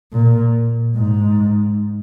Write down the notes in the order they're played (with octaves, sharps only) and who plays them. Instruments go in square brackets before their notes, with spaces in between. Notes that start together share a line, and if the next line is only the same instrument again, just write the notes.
[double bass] A#2
G#2